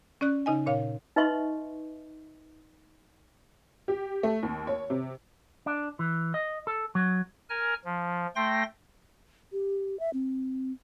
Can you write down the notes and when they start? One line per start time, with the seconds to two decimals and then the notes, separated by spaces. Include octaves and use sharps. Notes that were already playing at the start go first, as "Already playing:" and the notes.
0.21 C#4 D5 F#6
0.46 C#3 D#4 D#5 G#5
0.66 A#2 C#5 F5
1.16 D#4 B4 D#5 E5 C6 C#6
3.88 G4
4.23 A3
4.43 D#2
4.67 C#5
4.90 C3
5.66 D4
5.99 E3
6.34 D#5
6.67 A4
6.95 F#3
7.50 A#4 G#5 F6
7.85 F3
8.36 A3 G5 C6 A#6
9.52 G4
10.00 E5
10.13 C4